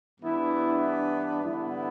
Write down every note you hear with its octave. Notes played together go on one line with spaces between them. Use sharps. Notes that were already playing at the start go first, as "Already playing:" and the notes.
G2 E3 B3 D4 E4
G2 D3 B3 E4